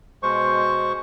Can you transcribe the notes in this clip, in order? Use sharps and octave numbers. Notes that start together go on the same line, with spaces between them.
B2 G#3 C5 C#6